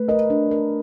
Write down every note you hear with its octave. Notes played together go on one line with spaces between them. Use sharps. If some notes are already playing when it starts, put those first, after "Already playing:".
Already playing: A3 B4
A#4 D#5
D4
A#4